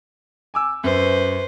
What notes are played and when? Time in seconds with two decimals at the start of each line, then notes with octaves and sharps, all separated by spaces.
0.54 G#5 D6 E6
0.84 F#2 B4 C5